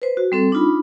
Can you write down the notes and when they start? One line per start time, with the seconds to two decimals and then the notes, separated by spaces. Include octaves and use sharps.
0.02 B4 C5
0.17 F#4
0.32 G3 C4 A4
0.52 D4 D#4 F4 B5